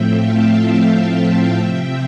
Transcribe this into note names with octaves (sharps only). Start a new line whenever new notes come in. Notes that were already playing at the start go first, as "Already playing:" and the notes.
Already playing: A2 F3 A3 C4 E5 G5
F5 A5
F5 A5
C3 F3 C4 E5 G5